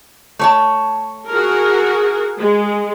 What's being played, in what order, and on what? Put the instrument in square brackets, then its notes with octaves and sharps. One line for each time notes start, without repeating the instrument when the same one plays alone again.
[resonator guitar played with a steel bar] A3 C#5 A5
[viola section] F#4 G#4 A#4
G#3